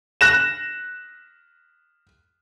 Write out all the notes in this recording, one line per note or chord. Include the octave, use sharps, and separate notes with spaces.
F#6 A#6 E7